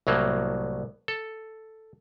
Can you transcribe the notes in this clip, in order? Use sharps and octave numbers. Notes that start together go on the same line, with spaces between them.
C2 A2 F#3 A#3
A4